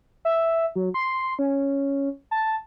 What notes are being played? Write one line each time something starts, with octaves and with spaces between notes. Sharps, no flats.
E5
F#3
C6
C#4
A5